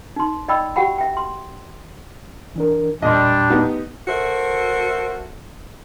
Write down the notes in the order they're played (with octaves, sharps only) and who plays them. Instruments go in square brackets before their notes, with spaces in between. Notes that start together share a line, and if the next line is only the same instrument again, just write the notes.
[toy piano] D#4 C6
D5 D#5 G5 B5 E6
F#4 G4 F#5 G5 B5
E5 G5
C6
[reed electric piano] E3 D4 A#4
[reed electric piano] E2 A#2 C6 [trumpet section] G3 D4 [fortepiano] D#5
[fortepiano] B3 D#4 G4
[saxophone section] F#4 A4 A#4 C5 E5